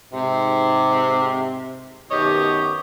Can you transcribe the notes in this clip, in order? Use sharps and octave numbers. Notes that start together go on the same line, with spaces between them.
G#2 C3
F#2 B2 D#3 G4 C#5 D#5